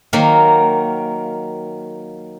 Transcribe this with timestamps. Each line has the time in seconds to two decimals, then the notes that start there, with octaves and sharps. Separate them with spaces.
0.13 D#3 F#3 A#3